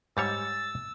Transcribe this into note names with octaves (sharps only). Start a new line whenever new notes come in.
G#2 G3 C#5 E6 A6